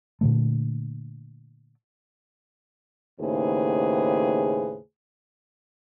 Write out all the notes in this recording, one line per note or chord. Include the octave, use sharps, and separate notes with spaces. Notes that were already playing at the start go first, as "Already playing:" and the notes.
A#2 D3 A3
D#2 A2 C#3 G#4 B4 C5